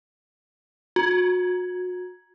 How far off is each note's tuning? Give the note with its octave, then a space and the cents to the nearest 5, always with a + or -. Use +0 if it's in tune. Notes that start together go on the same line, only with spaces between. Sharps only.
F#4 -35